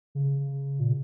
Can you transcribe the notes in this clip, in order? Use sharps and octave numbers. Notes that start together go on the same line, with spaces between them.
C#3
A#2